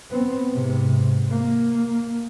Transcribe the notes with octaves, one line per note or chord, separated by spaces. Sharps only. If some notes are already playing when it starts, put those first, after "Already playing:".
B3 C4
G#2 C3
A#3